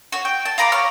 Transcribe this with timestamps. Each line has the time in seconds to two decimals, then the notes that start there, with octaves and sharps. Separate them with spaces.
0.12 F#4 C#5
0.25 G5
0.45 A5
0.58 F5 A#5 B5 D6
0.72 C#5 F6